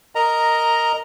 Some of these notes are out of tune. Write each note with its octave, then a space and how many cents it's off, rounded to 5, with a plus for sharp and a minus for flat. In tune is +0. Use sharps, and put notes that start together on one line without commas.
A#4 -10 D#5 +0 A#5 +0